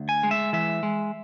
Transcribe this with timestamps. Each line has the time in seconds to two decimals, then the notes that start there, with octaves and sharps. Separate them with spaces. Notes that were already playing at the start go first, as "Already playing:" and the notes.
Already playing: D2
0.09 G#5
0.23 G#3
0.31 E5
0.53 E3 E5
0.83 G#3